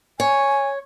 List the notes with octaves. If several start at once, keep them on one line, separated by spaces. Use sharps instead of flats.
C#5 G#5